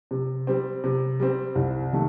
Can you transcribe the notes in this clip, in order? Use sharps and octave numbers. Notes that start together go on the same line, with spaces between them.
C3
G3 C4
C3
G3 C4
C2
C3 D#3 A3